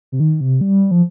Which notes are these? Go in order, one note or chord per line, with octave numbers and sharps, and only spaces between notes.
C3
D#3
C3
G3
F3